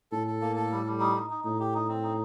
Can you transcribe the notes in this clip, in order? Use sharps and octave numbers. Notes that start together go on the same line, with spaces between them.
A2 A4
A4
A#3
A4
G3
G3
D#4
D#4
D#4
A2 D#4
G4
D#4
C4
D#4